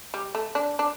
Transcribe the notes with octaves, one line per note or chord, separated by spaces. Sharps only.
G3
A3
D4
D4